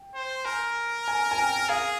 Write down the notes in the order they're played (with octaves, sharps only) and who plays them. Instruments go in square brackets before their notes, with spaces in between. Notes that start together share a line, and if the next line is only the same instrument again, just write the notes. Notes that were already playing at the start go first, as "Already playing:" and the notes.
Already playing: [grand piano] G5
[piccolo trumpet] C5
[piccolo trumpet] A#4 [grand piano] G#5
[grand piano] G#5
G#5
G5
[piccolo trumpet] G#4 [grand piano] F5